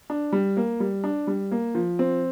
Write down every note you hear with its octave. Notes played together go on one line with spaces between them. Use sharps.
D4
G3
A#3
G3
D4
G3
A#3
F3
C4